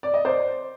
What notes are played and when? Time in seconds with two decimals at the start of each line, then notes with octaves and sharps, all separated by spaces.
0.03 D5
0.14 D#5
0.25 C5 D5